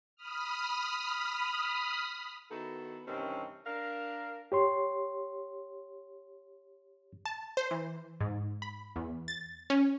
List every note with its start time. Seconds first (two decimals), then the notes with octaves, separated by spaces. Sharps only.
0.16 B5 D#6 F6
2.51 D#3 B3 E4 F#4 A4
3.08 G2 C3 D#3 E3 C4 C#4
3.66 D4 A#4 F5
4.52 G4 C#5 C6
7.25 A5
7.57 C5
7.71 E3
8.21 G#2
8.62 B5
8.96 E2
9.28 A6
9.70 C#4